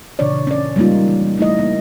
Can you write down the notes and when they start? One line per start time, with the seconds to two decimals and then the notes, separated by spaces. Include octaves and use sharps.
0.19 A#2 C#3 E3 D4 C#5 D5
0.47 C#4 D5
0.76 G3 G#3 A#3 D#4 F4
1.08 E3
1.38 A3 D#4 E4 D#5
1.59 A#3